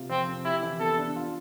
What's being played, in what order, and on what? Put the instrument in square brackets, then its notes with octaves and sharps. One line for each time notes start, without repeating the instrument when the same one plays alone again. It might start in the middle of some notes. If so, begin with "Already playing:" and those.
Already playing: [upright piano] C3 F4
[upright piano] F3 [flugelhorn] C4
[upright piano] C4
[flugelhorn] E4 [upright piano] G4
[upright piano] E3
[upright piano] B3 [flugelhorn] A4
[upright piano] D4
F4